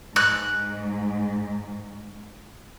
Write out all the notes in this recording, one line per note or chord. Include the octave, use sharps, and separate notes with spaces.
G#2 F#6